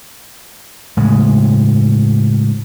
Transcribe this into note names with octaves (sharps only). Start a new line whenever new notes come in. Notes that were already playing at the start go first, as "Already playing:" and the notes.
A2 C#3 G#3